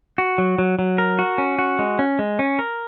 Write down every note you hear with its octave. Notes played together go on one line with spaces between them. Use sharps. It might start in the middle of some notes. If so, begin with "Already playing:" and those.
F#4
F#3
F#3
F#3
A#4
F#4
C#4
F#4
G#3
C#4
G#3
C#4
A#4